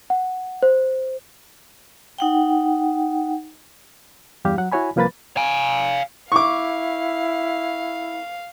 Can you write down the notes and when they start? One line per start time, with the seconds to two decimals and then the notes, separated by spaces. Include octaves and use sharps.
0.10 F#5
0.63 C5
2.18 D#4 F#5 G5
4.45 E2 G2 G3 G4 F5
4.58 F#3 F#5
4.72 E4 F#4 C#5 G#5 B5
4.96 C2 F3 A#3 B4 B5 A6
5.37 F5 G#5
6.32 E4 F5 C#6 D6